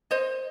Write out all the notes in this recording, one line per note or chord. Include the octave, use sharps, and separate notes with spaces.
C5 D#5